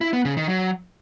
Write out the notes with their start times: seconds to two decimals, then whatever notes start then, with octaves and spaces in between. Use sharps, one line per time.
0.01 E4
0.13 B3
0.25 C#3
0.37 D#3
0.49 F#3